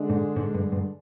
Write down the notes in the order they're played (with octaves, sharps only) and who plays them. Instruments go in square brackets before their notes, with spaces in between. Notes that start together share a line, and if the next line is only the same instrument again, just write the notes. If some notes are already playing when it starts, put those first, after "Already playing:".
Already playing: [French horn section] D3 G#3 D4
[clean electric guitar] G#2
G#2
G2
G2